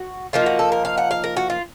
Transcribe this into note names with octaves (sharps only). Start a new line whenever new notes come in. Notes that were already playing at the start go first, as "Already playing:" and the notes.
Already playing: F#4
F3 A#3 D#4 F4
F#4
A4
A#4
F5
F#5
F5
A#4
F#4
F4